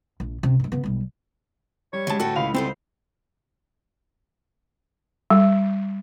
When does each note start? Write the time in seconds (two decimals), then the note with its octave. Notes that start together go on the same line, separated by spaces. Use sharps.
0.20 A#1
0.43 C#2 C3
0.60 G2 G#3
0.72 C#3 B3
0.84 B1 G3
1.93 G3 C#5
2.07 D2 C#3 G3 G#3 A5
2.20 A2 B3 C#4 F#4 A4 G5
2.36 C#2 F5 B5 F7
2.54 G2 D3 B3 C4 A4 C5
5.30 G3